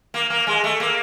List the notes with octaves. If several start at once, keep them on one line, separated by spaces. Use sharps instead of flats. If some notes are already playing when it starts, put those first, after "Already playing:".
A#3
A#3
G#3
A3
A#3